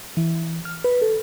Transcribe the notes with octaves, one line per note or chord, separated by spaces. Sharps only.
E3
F6
B4
A4